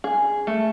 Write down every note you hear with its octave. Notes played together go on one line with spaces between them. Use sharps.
G#4
A3